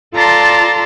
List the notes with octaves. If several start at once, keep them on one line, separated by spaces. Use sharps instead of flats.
F4 A4 D5 A5 A#5 C6